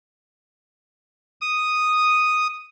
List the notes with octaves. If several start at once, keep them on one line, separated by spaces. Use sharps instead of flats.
D#6